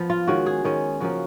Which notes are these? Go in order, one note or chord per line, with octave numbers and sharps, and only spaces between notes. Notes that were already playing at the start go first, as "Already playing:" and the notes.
Already playing: F3 B3
F4
D#3 G#3 C#4 F#4
G#4
D#3 G#3 C#4
C#3 F3 A#3 C#4 F#4